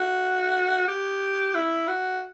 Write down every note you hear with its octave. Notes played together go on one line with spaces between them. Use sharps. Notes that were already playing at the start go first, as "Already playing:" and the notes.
Already playing: F#4
G4
E4
F#4